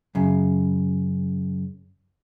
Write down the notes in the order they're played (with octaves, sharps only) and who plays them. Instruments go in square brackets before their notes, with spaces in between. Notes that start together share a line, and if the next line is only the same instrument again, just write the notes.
[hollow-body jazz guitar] F#2 C#3